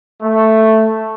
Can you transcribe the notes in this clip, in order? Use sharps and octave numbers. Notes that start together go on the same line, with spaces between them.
A3